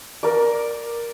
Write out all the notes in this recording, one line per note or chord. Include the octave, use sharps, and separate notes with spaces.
A#4 D5